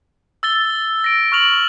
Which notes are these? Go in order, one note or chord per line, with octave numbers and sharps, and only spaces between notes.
E6 A6 G7
A#6 D7
C#6 F6 F7 F#7